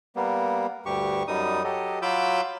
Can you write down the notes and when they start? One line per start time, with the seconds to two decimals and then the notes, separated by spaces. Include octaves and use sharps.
0.16 G3 A#3 B3
0.86 D2 G2 G4 C#6
1.28 F#2 G3 D#4 D#6
1.64 F#3 G4 A4 D#5
2.02 F#3 F4 B5 D6 E6 G6